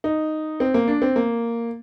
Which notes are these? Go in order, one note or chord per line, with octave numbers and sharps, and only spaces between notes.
D#4
C4
A#3
D4
C4
A#3